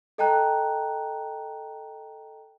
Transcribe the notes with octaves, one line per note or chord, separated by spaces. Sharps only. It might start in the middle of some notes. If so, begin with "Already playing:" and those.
A4 D#5 G5 A5 A#5 F#6